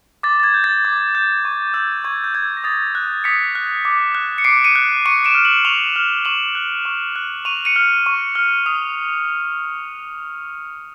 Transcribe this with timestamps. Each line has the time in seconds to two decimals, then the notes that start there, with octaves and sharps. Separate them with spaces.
0.23 D6 A6
0.40 A6
0.43 G#6
0.54 G6
0.64 A6
0.85 D6
1.15 G6
1.45 C#6
1.74 E6 G6
2.04 C#6 G#6
2.24 G6
2.34 E6 G6 G#6
2.57 A#6
2.64 D#6 A6
2.95 F#6
3.24 D#6 B6 C#7
3.55 F#6
3.85 D6
4.15 F#6
4.38 C#7
4.44 D6 C7 D7
4.64 C#7 D#7
4.76 F#6
5.06 C#6 C#7 D#7
5.25 D7 E7
5.35 F6
5.45 E7 F#7
5.65 C#6 F7 G7
5.96 F6
6.25 C#6 E7 F#7
6.55 F#6
6.85 C#6
7.16 F#6
7.45 C#6 D#7 F7
7.65 C#7 D#7
7.76 F6
8.06 C#6
8.35 F6
8.66 D#6